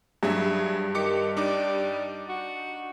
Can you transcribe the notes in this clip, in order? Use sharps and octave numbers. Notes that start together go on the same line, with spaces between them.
G2 F#3 G#4 E5
D#3 G4 D6 C#7
G3 D4 D#4 D6
F#4